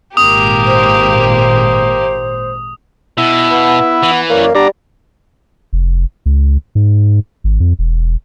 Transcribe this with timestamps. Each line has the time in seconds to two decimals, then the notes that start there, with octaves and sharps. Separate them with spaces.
0.17 G#1 A#2 A#3 G4 D#6
0.65 C5
3.18 B2 E4
3.50 B3 B4
4.03 E3
4.30 F#2 A#3 C#5 D5
4.55 G3 B3 D4 A#5
5.73 F1
6.26 C#2
6.75 G#2
7.44 G#1
7.60 F2
7.79 E1